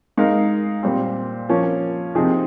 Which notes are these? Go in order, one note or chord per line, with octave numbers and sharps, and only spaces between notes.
G#3 D#4 A#4 F5
A#2 G3 C4
F3 A#3 C#4
C3 F3 C4 D#4 G#4